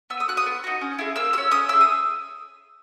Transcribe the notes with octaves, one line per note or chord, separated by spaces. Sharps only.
B3 E6
D#6
F#4 F#6
D#6
B3
D#4 F#4
C#4
E4 G#4
A#3 E6
C#4 F#4 E6
C#4 D#6
E4 G#4 E6
D#6